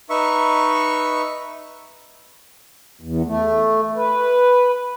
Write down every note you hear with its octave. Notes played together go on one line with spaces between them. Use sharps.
D#4 B4 E5 C#6
E2
A3
B4